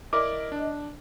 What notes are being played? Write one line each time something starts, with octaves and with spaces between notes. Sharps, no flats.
E4 A#4 D5 D#5 D6
D4